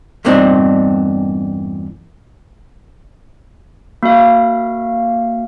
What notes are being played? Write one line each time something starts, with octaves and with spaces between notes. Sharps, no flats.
E2 G2 A#2 C4 D4 D#4
A#3 F#4 E5 F5